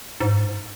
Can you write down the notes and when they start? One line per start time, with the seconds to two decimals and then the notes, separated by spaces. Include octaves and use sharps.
0.20 G#2